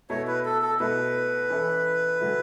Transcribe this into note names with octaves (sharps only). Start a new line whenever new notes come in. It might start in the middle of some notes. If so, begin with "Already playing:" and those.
B2 A3 E4 C#5
B4
A4
A4
B2 A3 E4 A4 B4
E3 C#4 E4 A4
C#3 F#3 A3 E4